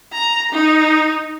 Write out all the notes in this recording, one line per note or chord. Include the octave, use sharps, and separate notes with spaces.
A#5
D#4